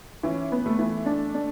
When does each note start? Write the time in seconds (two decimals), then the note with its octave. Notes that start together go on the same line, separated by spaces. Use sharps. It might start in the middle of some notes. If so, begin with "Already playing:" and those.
0.23 E3 C#4
0.52 B3
0.66 A3
0.79 E3
1.06 D4
1.34 D4